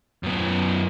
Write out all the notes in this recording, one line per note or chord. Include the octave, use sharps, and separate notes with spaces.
F#2 B3